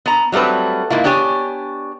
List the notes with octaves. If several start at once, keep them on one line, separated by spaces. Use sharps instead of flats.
B3 A#5
F#3 G3 A3 C4 B4
G#2 A#3 E4 F4
B3 D4 G4 C#5 G#5